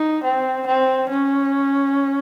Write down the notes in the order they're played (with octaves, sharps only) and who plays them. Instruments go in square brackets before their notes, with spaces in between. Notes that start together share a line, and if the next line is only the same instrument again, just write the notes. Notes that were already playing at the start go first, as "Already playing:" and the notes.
Already playing: [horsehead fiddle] D#4
C4
C4
C#4